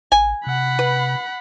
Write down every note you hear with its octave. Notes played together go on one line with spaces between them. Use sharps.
A1 G#5
C3 F#5 B5
B4